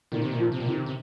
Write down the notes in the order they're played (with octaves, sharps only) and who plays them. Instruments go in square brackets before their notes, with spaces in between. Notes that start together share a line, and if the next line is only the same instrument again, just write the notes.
[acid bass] A#2 [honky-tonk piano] D#3
[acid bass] C3
A#2
[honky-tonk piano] F3
[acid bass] C3
A#2
[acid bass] C3 [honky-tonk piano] D#3
[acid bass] C3